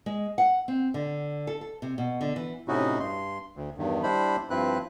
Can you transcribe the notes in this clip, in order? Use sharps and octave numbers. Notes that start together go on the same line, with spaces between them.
G#3
F#5
C4
D3
A4
A4
C3
B2
D3
E3
A2 C3 C#4 D#4 E4 F#4
G2 C6
D2
E2 G2 D#3
G3 D4 E4 C5 B5
G2 F3 C4 E4 B4 F#6